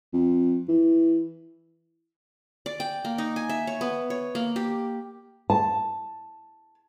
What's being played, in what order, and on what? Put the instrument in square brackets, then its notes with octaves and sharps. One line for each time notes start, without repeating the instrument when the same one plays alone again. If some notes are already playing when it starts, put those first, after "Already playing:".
[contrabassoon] F2
E3
[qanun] D5
G5
A#3
D#4
G#5
E5
C#5
B3
C#5
A#3
G4
[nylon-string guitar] A5